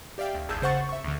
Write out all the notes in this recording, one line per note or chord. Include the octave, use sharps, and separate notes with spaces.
G4 D5 E5 F5 G5
D2
G#1 E2 G#4 A5 E6 G6
C#3 C5 F#5 C#6 A6
E5 C#6
D2 D3